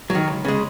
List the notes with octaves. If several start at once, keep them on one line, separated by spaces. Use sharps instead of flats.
F#3
D#3
C#2
C#3 G#3